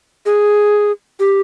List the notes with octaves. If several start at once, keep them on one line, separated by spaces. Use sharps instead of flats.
G#4
G4